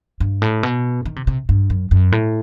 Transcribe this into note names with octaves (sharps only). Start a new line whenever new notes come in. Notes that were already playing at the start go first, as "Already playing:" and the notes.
G2
A2
B2
D#3
C3
C3
G2
F#2
F#2
A2